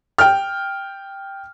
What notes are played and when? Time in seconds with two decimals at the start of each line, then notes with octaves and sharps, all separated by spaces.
0.18 G5 F6